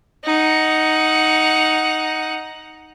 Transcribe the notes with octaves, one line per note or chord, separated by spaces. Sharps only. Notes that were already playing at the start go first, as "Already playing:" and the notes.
D#4 F#5